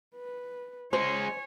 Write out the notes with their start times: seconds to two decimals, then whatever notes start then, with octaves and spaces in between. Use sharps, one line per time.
0.16 B4
0.93 G#3 C#4 C5 C#5 G#5